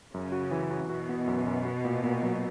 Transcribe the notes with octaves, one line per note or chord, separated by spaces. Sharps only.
F#2 C#3
F#4
E3
F#4
B2 F#4
B3
F#2
F#2
F#4
A#2
A#2
F#3